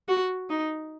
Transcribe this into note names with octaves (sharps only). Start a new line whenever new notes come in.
F#4
D#4